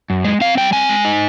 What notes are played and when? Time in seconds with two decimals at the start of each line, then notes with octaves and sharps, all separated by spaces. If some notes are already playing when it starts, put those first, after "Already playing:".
0.10 F#2
0.25 G#3
0.41 C4 F5
0.57 G3 G5
0.73 C4 G#5
0.89 G#3
1.05 D#4